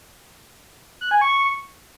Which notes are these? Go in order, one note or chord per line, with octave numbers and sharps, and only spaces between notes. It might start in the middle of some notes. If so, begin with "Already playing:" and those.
F#6
G#5
C#6